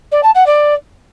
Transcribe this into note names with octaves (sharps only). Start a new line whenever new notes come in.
D5
A5
F#5
D5